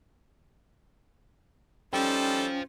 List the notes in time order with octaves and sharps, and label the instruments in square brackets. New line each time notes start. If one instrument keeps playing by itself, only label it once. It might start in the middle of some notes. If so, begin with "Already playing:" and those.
[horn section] G3 D#4 A4 [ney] C#4 [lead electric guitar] F4 C5 [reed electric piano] G5